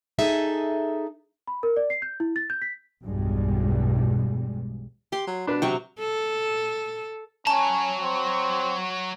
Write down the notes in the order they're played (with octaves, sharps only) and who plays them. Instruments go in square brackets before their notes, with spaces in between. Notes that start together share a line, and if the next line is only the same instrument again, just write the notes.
[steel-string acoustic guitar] D#4 G#4 A4 E5
[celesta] B5
A#4
D5
C7
G6
E4
A6
G6
B6
[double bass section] B1 E2 G2 B2 G3 G#3
[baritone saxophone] G4 [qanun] C6
[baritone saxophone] F#3
[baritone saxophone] B2 [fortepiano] D4 B4
[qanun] C3 F#3 C#6 [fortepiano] G5
[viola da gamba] A4
[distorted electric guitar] F#3 A#5 [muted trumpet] C#4 [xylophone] A5 [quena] C#6
[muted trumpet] C4